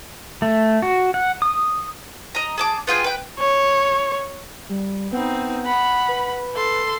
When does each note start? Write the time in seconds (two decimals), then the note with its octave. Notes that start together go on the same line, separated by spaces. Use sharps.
0.42 A3
0.82 F#4
1.14 F#5
1.42 D#6
2.35 D#5 A#5
2.58 G#4 A5 D6
2.87 B3 F4 G#4 G5
3.04 B4 G5
3.40 C#5
4.69 G3
5.12 B3 C4 D#4
5.65 F#5 B5
6.08 B4
6.55 A4 C6